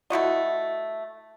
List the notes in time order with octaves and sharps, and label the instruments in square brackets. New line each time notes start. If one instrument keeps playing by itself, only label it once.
[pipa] A3 E4 F#4 D#5